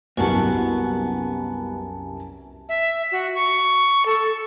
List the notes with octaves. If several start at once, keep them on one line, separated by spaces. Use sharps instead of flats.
C2 F#2 A#3 B3 F#4 G#5 A5
E5
F#4
C#6
A4